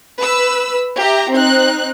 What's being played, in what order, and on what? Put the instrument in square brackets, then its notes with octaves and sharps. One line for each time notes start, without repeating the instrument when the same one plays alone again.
[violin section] B4 E6
G4 E5 A#5
C4 D#4 F#6